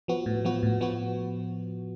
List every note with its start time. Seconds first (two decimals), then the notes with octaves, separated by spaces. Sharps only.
0.08 F3 B3 F#4
0.26 A2
0.45 F3 B3 F#4
0.63 A2
0.81 F3 B3 F#4